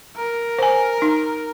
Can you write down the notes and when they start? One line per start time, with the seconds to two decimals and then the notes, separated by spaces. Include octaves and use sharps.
0.17 A#4
0.59 C5 G#5
1.02 D#4